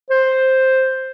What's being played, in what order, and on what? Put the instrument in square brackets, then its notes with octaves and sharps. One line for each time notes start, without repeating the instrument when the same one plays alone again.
[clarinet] C5